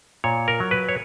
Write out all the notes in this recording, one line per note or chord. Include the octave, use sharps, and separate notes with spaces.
A#2 C#5
A#4
F#3
B4
C#5